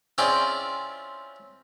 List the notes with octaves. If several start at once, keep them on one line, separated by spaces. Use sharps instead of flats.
C4 C#4 E4 F4 G#4 D5